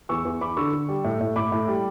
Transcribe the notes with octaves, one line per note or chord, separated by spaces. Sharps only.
E2 C#6 E6
E2
E2 B5 D6
D3 C#6 E6
D3
G3
A2
A2
A2 B5 D6
A2
G3